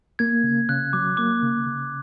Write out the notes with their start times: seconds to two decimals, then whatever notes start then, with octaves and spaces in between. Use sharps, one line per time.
0.19 A#3 G#6
0.44 C#3
0.69 C#3 F#6
0.93 F#3 D6
1.17 A#3 D6
1.43 C#3
1.67 C#3